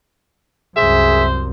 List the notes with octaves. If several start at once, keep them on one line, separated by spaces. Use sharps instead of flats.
C2 F#2 G#4 C5 E5